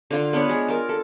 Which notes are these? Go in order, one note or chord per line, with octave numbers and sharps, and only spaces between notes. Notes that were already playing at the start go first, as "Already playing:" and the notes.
D3 F4 C6
B3 D4 B4 C#5
G#3
F4 A#4
A4